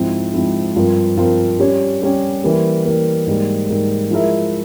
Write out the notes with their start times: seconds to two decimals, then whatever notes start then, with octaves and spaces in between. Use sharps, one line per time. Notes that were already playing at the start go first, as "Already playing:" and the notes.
Already playing: G#2 F3 C4 E4
0.34 G#2 F3 C4 E4
0.76 G2 F3 C4 F4 A#4
1.17 G2 F3 C4 F4 A#4
1.59 G3 C#4 G4 C#5
2.02 G3 C#4 G4 C#5
2.44 E3 G3 A#3
2.85 E3 G3 A#3
3.27 G#2 G3 A#3
3.69 G#2 G3 A#3
4.11 F3 G#3 E4 A#4 E5